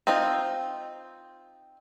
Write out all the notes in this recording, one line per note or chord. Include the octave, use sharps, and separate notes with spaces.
C4 D#4 F4